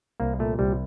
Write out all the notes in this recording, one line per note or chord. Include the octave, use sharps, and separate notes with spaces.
C2 A#3
A#2 A3
C2 G3